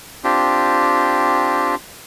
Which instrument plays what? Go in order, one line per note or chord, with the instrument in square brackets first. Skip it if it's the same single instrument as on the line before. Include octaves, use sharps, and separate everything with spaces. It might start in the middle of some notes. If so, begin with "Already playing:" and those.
[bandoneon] C4 D4 F4 G4